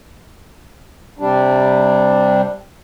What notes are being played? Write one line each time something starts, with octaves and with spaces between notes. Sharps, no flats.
C3 G3 D4